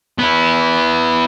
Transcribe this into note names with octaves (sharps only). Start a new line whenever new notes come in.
B3 E4